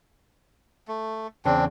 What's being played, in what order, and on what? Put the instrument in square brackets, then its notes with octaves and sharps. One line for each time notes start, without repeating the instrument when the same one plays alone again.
[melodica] A3
[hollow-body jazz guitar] E2 C#3 [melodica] C4 D4